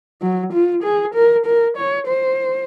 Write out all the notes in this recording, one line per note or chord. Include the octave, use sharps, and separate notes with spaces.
F#3
F4
G#4
A#4
A#4
C#5
C5